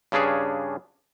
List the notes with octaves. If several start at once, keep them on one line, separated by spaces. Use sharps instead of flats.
G2 C#3 C#4 D4 G#4